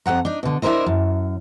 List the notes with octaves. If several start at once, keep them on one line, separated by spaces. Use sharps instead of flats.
F2 F#3 F#5 A#5
D4 D#4
B2 D3
D4 E4 A4 A#4 C5 D#5
F#2